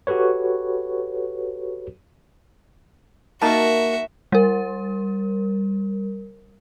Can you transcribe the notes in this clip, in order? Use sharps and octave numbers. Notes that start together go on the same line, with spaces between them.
F#4 G4 A4 B4 C#5
A#3 D#4 F#4 A#4 E5 A5
G3 A#4